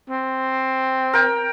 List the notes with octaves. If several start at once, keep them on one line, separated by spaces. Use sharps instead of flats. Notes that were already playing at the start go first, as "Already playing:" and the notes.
C4
A#4 G5